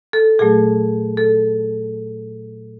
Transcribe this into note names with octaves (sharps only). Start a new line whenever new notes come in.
A4
A#2 F#3 A3 G#4
A4